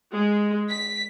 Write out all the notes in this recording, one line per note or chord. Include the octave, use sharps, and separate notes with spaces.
G#3
B6